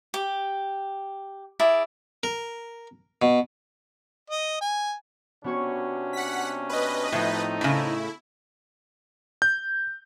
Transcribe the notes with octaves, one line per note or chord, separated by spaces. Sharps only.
G4
E4 G#4 D5
A#4
B2
D#5
G#5
C3 B3 C#4 D4 F#4 C#5
F#5 B6
B4 D#5
A2 F3 A3 C4 D#4
A2 C#3 E4
G6